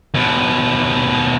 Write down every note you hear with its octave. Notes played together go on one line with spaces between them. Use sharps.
D#2 B2